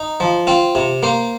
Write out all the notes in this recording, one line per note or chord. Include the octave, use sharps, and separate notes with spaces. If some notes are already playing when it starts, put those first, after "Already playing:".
Already playing: D#4
F3
C4 F4
C3
A#3 C5